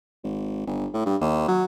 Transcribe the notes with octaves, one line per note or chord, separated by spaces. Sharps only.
G#1
G1
A2
G2
D#2
F#3